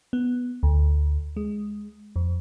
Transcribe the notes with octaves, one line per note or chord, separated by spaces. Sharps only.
B3
D2
G#3
F2